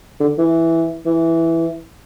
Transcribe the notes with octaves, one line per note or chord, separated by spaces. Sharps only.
D3
E3
E3